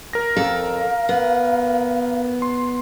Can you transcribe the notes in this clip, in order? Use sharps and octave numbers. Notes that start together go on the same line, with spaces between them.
A#4 A#6
F2 A4 F5
B3
C6